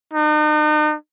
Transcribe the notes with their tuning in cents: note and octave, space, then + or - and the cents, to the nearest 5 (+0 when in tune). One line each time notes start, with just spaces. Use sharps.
D#4 -40